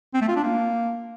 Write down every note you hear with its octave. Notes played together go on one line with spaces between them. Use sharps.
C4
A3
F4
D4
A#3